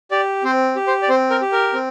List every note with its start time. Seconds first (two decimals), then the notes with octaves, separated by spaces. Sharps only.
0.11 G4 D5
0.44 C4 C5
0.76 G4
0.87 C5
1.03 D5
1.09 C4 C5
1.30 A#4
1.42 G4
1.52 A#4
1.74 C4